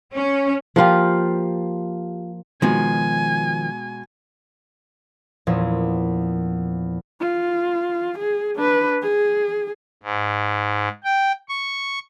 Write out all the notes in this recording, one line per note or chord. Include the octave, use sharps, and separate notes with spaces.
C#4
F3 A#3 F4 G4
B2 D#3 F3 G#3 G#5
E2 A#2 F3 C#4
F4
G#4
D4 B4
G#4
G#2
G5
C#6